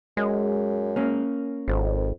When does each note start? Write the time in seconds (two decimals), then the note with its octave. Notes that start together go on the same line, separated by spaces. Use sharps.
0.17 F#2 G#3
0.96 A#3 C#4
1.68 G#1 F2